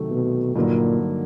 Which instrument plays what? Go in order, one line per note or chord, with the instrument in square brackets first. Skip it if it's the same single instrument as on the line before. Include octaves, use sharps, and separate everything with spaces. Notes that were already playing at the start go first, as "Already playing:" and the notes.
Already playing: [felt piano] C3 D#3 F#3 A3
[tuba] B2
[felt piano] G2 D3 F#3 A#3 D#4 [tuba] A#2